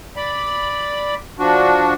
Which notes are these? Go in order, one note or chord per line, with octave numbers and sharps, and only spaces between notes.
D5 B5
F3 D4 F#4